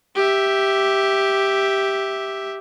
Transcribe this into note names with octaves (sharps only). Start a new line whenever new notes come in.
G4 E5